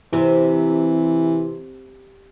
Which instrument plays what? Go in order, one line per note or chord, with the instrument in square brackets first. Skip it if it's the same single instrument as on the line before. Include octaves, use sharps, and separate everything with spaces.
[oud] C3 [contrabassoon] E3